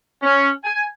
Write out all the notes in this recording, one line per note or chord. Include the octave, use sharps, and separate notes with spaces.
C#4
G#5